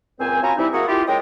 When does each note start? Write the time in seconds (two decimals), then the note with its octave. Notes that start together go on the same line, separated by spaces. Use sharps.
0.19 C#2 A#2 C4 C5 G#5
0.43 C#4 F4 F#4 G#5 A#5 B5
0.57 C3 G3 C4 D#4 E4
0.73 A#3 F#4 G#4 E5 F#5 A#5
0.87 E4 F4 G4
1.07 G#3 C#4 A#4 D#5 G5